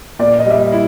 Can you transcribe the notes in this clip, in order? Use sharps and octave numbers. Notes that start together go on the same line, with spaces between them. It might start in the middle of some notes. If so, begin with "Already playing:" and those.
A#2 D5
D#5
G3 E5
D#5
E4